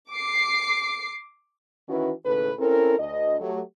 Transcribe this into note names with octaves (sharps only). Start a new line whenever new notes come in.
D6 C7
D#3 E3 C#4 E4 F#4 B4
D#2 A2 C#3 A4 B4
C4 C#4 E4 A4 A#4
D2 D#5
F#3 A3 G4